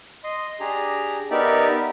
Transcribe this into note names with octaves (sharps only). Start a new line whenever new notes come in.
D#5 C6
D4 G4 G#4 A#5
B3 D#4 G4 A#4 D5 E5